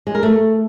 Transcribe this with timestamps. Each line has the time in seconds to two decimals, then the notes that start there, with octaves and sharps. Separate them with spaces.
0.07 G#3
0.15 A#4
0.23 A3